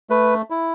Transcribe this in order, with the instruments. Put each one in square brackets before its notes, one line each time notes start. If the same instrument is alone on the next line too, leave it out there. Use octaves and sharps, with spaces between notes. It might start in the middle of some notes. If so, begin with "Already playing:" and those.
[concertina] A3 B4
E4